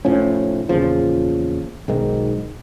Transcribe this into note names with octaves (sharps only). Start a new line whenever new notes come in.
F1 A2 F3 C#4
E2 A#2 C#3 F3
B1 G#2 D#3